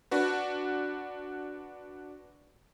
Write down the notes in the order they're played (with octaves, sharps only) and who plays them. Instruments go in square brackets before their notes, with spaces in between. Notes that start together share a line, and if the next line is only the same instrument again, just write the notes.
[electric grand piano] D4 F#4 B4